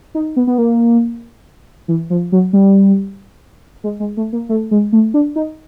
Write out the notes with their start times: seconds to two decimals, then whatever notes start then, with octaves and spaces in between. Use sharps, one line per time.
0.15 D#4
0.36 B3
0.47 B3
0.58 A#3
1.88 E3
2.10 F3
2.32 F#3
2.53 G3
3.84 G#3
4.00 G#3
4.17 A3
4.33 A#3
4.49 A3
4.71 G#3
4.93 A3
5.14 D4
5.36 D#4